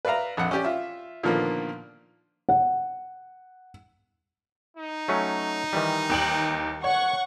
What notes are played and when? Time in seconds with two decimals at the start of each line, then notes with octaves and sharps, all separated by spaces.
0.05 B4 D5 E5 F5 A#5
0.37 A#1 F2 F#5
0.51 C#4 G4 D5
0.65 F4 E5
1.23 A#2 D3 D#3 F3 A#3 B3
2.49 F#5
4.77 D#4
5.08 F#3 A3 C#4
5.73 D#3 E3 G3
6.10 D#2 G5 F#7
6.84 C#5 F#5 C#6